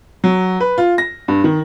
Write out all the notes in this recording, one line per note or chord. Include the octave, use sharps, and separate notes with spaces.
F#3
B4
F4
A#6
G2
D#3